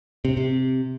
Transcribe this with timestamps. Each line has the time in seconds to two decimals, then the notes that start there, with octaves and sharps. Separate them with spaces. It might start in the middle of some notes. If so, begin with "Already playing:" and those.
0.25 C3
0.37 C3